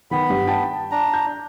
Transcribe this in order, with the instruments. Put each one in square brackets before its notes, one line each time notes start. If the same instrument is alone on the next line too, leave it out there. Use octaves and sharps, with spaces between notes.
[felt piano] D#3 [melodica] B3 B5
[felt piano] G2
G5 A5
[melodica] D4 A#5
[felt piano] G6